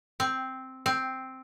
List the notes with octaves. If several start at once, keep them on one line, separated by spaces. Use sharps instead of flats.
C4
C4